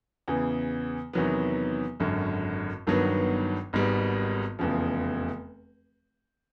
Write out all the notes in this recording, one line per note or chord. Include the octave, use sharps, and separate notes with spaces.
E2 C#3 E3
E2 C3 D#3 F#3 B3
G#1 F#2 D3
G1 G2 D#3 F#3 B3
G#1 G#2 D#3 G3 B3
F1 E2 C#3 F3